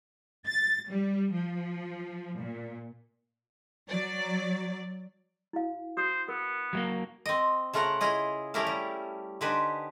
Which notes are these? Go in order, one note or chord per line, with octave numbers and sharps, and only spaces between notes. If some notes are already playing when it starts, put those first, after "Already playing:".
A6
G3
F3
A#2
F#3 D5
E4 F#4 F5
F#4 C5 D#6
B3 A#4
F#3 G#3 A#3
C4 D#5
C#3 A3 F4 A#4 F#5
E4 F4 G#4 D#5
A3 C#4 E4 G4 A#4 F5
G3
D3 D#4 G4 B4 C5 G#5